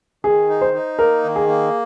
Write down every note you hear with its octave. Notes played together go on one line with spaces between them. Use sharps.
D#3 G#4
D#4
C5
D#4
A#3 A#4
D#3
G#4
A#3